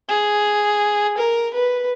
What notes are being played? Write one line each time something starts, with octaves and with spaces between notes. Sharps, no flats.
G#4
A#4
B4